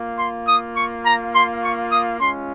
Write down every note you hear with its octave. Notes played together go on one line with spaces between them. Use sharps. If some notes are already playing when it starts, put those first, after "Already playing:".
Already playing: A#3 F4
C6
D#6
C#6
A#5
C6
C#6
D#6
G#3 C#4 F4 C6